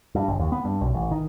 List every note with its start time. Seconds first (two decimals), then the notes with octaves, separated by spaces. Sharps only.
0.15 G2
0.28 G1
0.39 D#2
0.52 B3
0.65 G2
0.81 B1
0.94 A1
1.11 D#3